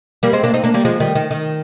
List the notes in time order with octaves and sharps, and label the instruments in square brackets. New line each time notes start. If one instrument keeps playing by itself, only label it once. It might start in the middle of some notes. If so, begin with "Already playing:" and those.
[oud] G3 A#3
G#3 C4
A#3 D4
C4 D#4
A#3 D4
G3 A#3
F3 G#3
D#3 G3
D#3
D#3